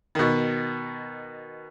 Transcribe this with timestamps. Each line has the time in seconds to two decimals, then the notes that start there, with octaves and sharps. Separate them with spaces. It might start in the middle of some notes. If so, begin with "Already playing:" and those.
0.15 B2 D#3